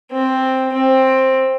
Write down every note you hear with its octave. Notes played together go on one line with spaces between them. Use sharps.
C4
C4